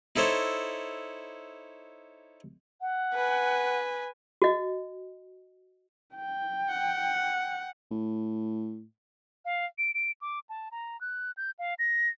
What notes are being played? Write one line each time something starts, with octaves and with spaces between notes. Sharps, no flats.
D#4 E4 A4 C5 C#5
F#5
B4 G#5
F#4 D#5
G5
F#5
A2
F5
D7
D7
D6
A5
A#5
F#6
G6
F5
A#6